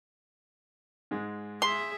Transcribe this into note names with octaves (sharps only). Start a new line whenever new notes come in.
G#2 G#3
G#4 E5 C6